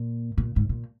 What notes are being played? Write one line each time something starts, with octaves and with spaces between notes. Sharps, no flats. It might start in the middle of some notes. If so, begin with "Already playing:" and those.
Already playing: A#2
A#2
G#2
A#2